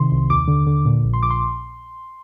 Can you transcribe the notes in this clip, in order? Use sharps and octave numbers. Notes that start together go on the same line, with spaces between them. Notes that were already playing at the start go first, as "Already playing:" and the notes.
Already playing: C3 D#3 C6
C2
D#2 D6
D3
D3
A#2
A#1
C6
A#1 D6
C6